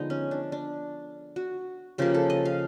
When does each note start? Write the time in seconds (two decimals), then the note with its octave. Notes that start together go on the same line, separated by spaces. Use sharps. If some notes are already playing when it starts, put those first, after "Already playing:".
Already playing: D3 F3 G#3 B3 D#4
0.10 C#4
0.31 D4
0.52 D4
1.36 F#4
1.98 C#3 F3 A#3 G4
2.14 A4
2.30 D#5
2.45 F5